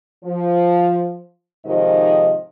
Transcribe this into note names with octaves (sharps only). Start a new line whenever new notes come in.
F3
G#2 C3 D#3 F3 D#5